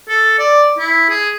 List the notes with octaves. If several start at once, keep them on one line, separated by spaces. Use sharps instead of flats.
A4
D5
E4
G#4